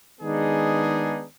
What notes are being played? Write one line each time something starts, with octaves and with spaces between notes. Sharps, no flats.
D#3 G#3 B3 D4 D#4 G#4